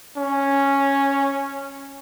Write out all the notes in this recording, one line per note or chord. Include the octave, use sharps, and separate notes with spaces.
C#4